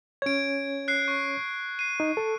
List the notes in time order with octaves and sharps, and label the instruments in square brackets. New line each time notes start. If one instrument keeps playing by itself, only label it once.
[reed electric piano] C#4 C#5 [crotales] G#6 D7
[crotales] F#6 C7
C#6
C7 D#7
[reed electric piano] D#4
A4